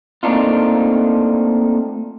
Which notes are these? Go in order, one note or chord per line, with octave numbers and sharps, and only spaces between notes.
A3 A#3 C4 D4 D#4 F4